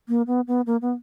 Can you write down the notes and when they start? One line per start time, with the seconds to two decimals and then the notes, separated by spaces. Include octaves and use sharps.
0.08 A#3
0.27 B3
0.48 B3
0.66 A#3
0.82 B3